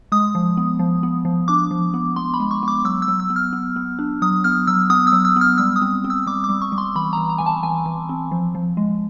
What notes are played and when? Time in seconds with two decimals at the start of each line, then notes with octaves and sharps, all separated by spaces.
0.12 G#3 D#6
0.35 F3
0.57 B3
0.79 F3
1.03 B3
1.25 F3
1.48 D4 D6
1.71 F3
1.94 B3
2.16 B3 C6
2.34 B5
2.40 G#3
2.51 C#6
2.63 B3 D6
2.84 F#3 E6
3.02 E6
3.08 F#3
3.20 E6
3.30 B3
3.36 F6
3.53 B3
3.76 B3
3.99 D4
4.22 F#3 D#6
4.44 B3 F6
4.67 F#3 E6
4.90 B3 D#6
5.07 E6
5.12 F#3
5.25 E6
5.36 B3 F6
5.58 G3 E6
5.76 D#6
5.82 C4
6.04 C4
6.10 E6
6.27 G3 D6
6.44 D6
6.49 G3
6.62 C#6
6.72 G3
6.78 C6
6.96 E3 B5
7.13 A#5
7.17 E3
7.29 A#5
7.38 E3 G#5
7.46 A5
7.63 E3 G#5
7.86 E3
8.09 C4
8.31 F3
8.55 F3
8.77 G#3